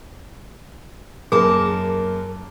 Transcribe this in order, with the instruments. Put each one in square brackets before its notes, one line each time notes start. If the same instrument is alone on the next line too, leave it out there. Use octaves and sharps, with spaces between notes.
[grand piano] F#2 A#3 [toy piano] G#4 [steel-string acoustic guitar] A#4 A5